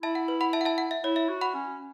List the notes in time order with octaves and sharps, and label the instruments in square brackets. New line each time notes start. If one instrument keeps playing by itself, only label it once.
[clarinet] E4 [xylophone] E5 A5
[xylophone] F#5
B4
F#5 B5
E5 A5
F#5
E5 A5
F#5
E5
[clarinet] E4 [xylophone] C#5
[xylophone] E5
[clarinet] F#4
[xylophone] F#5 B5
[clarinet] C#4